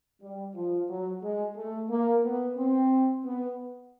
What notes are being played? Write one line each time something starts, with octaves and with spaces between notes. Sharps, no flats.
G3
F3
F#3
G#3
A3
A#3
B3
C4
B3